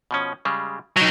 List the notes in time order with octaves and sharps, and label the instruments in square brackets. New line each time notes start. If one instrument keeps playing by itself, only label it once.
[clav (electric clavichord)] B2 F3 C#4
C#3 G3 G#3
[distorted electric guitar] F#3 D#4 [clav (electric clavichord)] D#5 G5